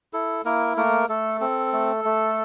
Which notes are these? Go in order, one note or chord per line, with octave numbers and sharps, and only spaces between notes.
E4 A4
A#3 E4 A#4
A3 A#3 A#4
A3 A4
C4 A4
A3
A3